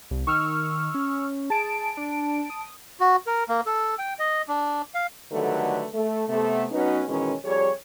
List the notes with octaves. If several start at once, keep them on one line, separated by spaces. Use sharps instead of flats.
C2
D#3 C#6 E6 F6
C#4
G#4 A5 D7
D4
D#6
F#4
A#4
A#3
A4
G5
D#5
D4
F5
D3 D#3 F#3 G3 A3 B4
A3
C3 A3 B3
F#3 B3 C#4 D#4 F#4 B4
B2 D#3 E3 G#3 C#4
F2 G3 G#4 C#5